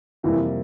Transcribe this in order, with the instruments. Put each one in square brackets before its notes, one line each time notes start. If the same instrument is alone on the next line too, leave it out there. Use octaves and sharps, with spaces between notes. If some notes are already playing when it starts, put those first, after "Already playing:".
[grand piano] F2 C3 G3 A#3 E4 [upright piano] E3